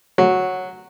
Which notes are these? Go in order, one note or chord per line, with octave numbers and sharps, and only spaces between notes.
F#3